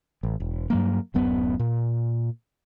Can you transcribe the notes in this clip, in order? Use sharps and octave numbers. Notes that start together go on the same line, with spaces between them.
A1
E1
G2 F#3 A#3
D1 F#2 B3
A#2